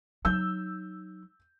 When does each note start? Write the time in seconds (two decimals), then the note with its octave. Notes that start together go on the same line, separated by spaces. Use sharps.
0.25 F#3 D#4 E6 G6